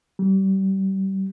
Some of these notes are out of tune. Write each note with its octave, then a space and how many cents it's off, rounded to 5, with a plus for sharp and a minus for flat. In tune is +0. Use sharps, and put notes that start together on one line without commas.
G3 -30